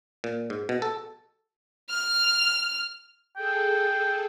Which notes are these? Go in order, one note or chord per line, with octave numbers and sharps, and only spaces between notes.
A#2
G#2
B2
A4
F6
G#4 A4 G5